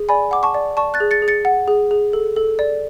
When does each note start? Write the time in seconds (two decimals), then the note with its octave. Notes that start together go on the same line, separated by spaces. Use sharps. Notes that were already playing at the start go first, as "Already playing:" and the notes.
Already playing: G#4
0.09 D5 G#5 B5
0.31 F#5 D6
0.43 A5 C#6
0.54 D5
0.77 D5 A5 C#6
0.94 F#6 A6
1.00 G#4
1.11 A6 C#7
1.22 G#4
1.28 A6 C#7
1.45 F#5
1.68 G#4
1.91 G#4
2.13 A4
2.36 A4
2.59 D5